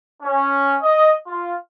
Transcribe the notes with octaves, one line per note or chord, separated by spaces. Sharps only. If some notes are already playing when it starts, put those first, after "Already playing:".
C#4
D#5
F4